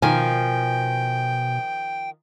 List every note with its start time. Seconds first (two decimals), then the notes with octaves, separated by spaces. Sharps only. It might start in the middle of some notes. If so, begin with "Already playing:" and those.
0.02 B2 D#3 F3 G5 G#5